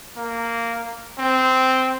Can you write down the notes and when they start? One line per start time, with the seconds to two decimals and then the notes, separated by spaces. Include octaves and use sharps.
0.16 A#3
1.18 C4